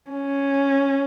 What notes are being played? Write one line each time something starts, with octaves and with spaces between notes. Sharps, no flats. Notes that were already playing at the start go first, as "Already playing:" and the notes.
C#4